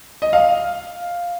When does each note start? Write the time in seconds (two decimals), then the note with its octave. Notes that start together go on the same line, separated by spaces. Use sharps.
0.22 D#5
0.33 F5